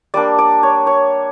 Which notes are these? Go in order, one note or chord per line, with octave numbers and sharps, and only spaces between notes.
G3 A#3 D4 D5
D5
C#5
C#5